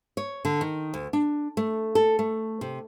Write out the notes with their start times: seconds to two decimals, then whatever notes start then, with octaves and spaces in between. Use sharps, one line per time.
0.17 C#5
0.45 D3
0.61 D#3
0.94 D2
1.13 D4
1.57 A3
1.95 A4
2.19 A3
2.61 C3